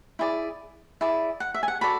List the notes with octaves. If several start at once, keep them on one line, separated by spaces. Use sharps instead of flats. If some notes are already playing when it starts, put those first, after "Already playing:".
E4 G#4 D5
E4 G#4 D5
F#5
E5
G#5
F#5
F#4 A4 D5 B5